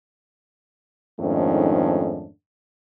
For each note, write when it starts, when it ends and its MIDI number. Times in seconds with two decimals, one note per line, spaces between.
1.20 2.28 41
1.20 2.28 44
1.20 2.28 51
1.20 2.28 57
1.20 2.28 61
1.20 2.28 62